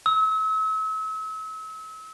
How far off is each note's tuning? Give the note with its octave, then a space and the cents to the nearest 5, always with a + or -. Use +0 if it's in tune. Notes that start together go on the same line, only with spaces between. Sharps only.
E6 -40